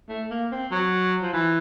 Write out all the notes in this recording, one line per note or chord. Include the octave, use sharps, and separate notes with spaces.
A3
A#3
C4
F#3
F3
E3